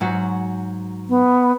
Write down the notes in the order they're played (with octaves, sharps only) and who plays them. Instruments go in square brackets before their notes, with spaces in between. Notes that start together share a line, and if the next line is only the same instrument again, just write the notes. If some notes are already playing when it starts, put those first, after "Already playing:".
[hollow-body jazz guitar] G#2 F#3 F#4
[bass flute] B3